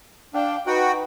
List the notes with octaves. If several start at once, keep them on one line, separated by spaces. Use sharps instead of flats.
D4 F5 G5
D#4 F#4 B4 F#5 G5